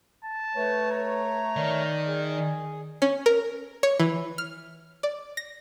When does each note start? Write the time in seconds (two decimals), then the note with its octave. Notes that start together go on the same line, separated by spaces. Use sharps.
0.25 A5
0.56 A3 B4 C#5
0.92 A#5
1.56 D#3 D5
2.07 G#4
3.02 C#4
3.26 A#4
3.83 C#5
4.00 E3
4.38 F6
5.03 D5
5.37 A#6